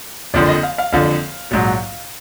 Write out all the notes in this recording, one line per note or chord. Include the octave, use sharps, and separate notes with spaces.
F#1 F2 D3 F3 D5
D#5
F5
F5
F#1 F2 D3 F3 F5
A#1 G#2 F#3